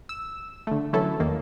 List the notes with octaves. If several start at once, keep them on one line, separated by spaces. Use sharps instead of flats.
E6
D3 A3
E3 F#3 C#4 E4 A4
E2 D#3 A#3